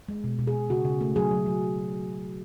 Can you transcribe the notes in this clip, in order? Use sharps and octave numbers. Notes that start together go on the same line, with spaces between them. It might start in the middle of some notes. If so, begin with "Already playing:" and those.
G#3
B2
B2
G#4
B2
C#3 F#4
C#3
A3
F#3 G#4
F#3
F#3